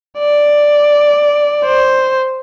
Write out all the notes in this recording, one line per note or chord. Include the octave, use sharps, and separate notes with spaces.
D5
C5